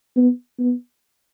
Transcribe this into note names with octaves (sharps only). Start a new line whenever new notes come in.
B3
B3